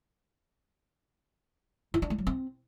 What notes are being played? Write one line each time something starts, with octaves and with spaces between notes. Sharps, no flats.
E4
D4
A3
F#3
C4